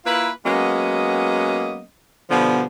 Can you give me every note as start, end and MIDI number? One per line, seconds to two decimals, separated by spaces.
0.06 0.30 58
0.06 0.30 64
0.06 0.30 65
0.06 0.30 71
0.45 1.83 54
0.45 1.83 56
0.45 1.83 58
0.45 1.83 59
0.45 1.83 61
0.45 1.83 75
2.31 2.64 47
2.31 2.64 50
2.31 2.64 53
2.31 2.64 55
2.31 2.64 59